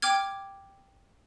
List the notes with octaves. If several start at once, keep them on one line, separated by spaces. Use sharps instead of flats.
G5 D6 F6 G#6